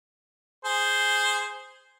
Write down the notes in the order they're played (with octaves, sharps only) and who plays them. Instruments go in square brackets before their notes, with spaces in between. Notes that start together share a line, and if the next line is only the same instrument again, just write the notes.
[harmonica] G#4 C5